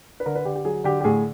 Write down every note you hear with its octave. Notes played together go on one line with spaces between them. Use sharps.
B4
D3 A#4
B4
D3 G4
G4
F#3 G#4
D3 G4
G4
A2 G#4